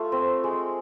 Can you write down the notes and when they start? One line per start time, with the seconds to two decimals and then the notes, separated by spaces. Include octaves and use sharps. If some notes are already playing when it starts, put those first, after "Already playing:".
Already playing: A3 F4
0.12 C4
0.44 G#3